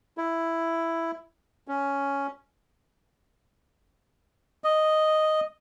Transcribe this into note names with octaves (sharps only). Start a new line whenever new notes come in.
E4
C#4
D#5